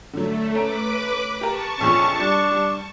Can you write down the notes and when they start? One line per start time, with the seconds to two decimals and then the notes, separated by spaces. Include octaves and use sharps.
0.13 D3 F#3 A3
0.55 C#4 B4 A#5 D6 D7
1.41 G4 A#4 A5 C#6
1.81 A#1 F2 F3 C#4
2.20 G3 D4
2.51 G3